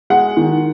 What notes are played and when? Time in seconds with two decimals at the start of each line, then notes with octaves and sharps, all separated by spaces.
0.10 G#3 F#5
0.37 D#3